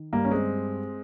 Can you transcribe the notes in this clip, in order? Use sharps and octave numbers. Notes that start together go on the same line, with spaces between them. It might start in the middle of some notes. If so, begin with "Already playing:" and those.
Already playing: D#3
G2 G3 A#3
C#4
G#3 C4